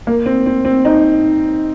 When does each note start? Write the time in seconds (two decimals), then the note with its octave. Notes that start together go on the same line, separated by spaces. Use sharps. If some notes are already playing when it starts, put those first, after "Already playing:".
0.07 A#3
0.26 C4
0.46 C4
0.65 C4
0.85 D#4